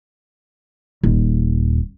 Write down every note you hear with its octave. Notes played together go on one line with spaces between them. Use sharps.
D#1